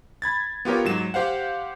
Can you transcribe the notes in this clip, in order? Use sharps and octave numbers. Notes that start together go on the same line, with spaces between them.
B5 G#6 A6
B3 F4 G4 A#4 C#5
G#2 F#3 E7
G4 C5 F5 F#5